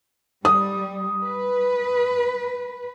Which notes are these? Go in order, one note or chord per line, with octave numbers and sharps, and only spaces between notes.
G3 D#6
B4